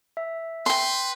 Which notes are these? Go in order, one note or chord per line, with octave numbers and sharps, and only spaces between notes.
E5
B4 G5 C6